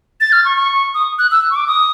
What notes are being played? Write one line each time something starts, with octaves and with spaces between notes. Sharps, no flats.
A6
F6
C#6
C#6
D#6
F#6
E6
C#6
D6
D#6